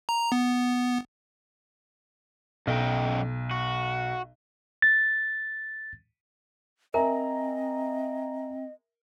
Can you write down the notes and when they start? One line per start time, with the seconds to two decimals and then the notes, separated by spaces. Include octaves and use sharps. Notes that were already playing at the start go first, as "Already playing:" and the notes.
0.09 A#5
0.32 B3
2.67 B1 F#2 D#5 G5
3.51 F#4
4.82 A6
6.94 C4 A#4 D#5 E5 G#5 A#5